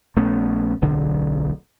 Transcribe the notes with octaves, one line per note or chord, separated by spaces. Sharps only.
A#1 A3 B3 C#4
D1 B1 D3